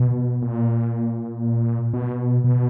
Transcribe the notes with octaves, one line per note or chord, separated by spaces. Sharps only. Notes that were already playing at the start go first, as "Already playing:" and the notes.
Already playing: B2
A#2
B2
B2